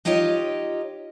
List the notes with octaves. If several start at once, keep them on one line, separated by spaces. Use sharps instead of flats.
D#4 F4 G4 C#5 D#5